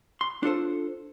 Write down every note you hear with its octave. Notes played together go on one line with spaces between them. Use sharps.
C6
D4 F4 A4 C5